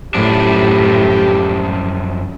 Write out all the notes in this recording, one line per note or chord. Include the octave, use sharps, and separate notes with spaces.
F#2 A2 F3 D4 G4